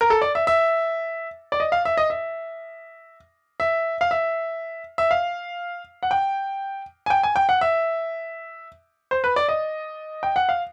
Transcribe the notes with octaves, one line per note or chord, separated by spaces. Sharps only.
A#4
A4
D5
E5
E5
D5
D#5
F5
E5
D#5
E5
E5
F5
E5
E5
F5
F#5
G5
G#5
G5
G#5
G5
F#5
E5
C5
B4
D5
D#5
G5
F#5
F5